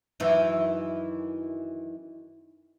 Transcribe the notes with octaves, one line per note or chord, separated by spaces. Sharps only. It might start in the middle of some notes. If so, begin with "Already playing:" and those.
F#2 D#3 E3